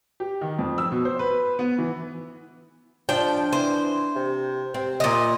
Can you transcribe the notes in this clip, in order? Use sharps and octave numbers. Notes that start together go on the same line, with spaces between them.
G4
D#3
F2
E6
B2
C5
B4
B3
E3
F3 D4 G5
E3 C5
C3
C3 C4
A#2 D#5